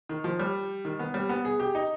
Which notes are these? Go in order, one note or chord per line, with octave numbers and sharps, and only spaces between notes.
D#3
F3
G3
D#3
B3
G3
B3
G#4
G4
D#4